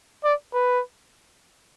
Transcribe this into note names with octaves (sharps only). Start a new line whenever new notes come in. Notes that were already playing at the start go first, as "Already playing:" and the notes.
D5
B4